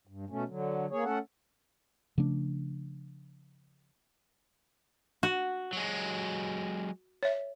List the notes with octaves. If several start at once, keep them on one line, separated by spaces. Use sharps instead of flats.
G2
B2 A3 C#4
D3 F#3
A#3 G#4 C#5
A3 C#4 A4 F#5
C#3 F3 A3 D4
F#4
F#3 G#3
C#5 E5